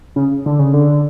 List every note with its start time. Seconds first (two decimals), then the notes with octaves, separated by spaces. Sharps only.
0.16 C#3
0.46 D3
0.59 C#3
0.74 D3